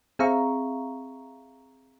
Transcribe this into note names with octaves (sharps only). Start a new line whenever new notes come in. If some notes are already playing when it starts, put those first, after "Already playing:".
C4 G#4 E5 F5 A#5 C#6